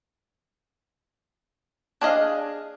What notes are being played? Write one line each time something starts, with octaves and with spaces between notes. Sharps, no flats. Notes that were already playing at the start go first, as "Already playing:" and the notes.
D4 G#4 D#5 F5